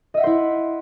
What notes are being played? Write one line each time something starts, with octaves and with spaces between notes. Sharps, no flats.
E4 C5 D#5 E5 F#5